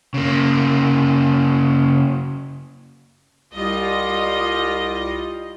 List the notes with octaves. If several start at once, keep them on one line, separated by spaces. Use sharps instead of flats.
C#3 A#3
C2 G3 F4 D#5